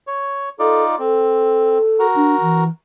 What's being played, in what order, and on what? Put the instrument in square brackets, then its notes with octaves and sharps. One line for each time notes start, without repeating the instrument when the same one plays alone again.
[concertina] C#5
[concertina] D#4 F4 D5 [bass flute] A4
[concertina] C4 [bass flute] A4
[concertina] F#4 A#4
[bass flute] D4
E3